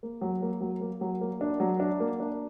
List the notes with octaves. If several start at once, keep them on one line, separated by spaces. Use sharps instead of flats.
A#3
F#3
A#3
F#3
A#3
F#3
A#3
D4
F#3
D4
A#3
D4